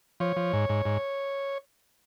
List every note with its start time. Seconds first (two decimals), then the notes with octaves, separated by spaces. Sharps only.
0.20 F3 C#5
0.36 F3
0.53 G#2
0.69 G#2
0.85 G#2